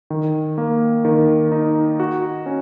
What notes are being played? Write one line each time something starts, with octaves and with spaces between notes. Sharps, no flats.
D#3
A#3
D#3
D#4
F#4
C#4